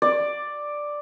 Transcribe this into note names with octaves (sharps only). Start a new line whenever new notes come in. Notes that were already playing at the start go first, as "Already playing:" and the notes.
D5